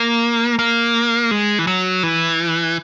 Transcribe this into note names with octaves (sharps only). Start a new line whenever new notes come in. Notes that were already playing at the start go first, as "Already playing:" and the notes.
Already playing: A#3
A#3
G#3
E3
F#3
E3